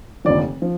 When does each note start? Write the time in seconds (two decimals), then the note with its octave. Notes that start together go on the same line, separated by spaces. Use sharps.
0.25 F1 D#2 D3 F3 D5
0.62 F3